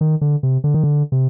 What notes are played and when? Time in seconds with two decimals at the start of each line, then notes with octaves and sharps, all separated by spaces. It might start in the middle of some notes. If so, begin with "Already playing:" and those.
0.01 D#3
0.21 D3
0.43 C3
0.64 D3
0.74 D#3
0.84 D3
1.12 C3